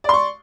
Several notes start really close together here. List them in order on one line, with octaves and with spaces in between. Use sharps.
D5 C6 C#6